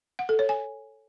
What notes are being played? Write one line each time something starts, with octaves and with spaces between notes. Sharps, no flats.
F#5
A4
C#5
G#5